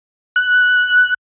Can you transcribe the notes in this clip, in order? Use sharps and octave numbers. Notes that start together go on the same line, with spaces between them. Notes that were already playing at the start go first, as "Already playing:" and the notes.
F#6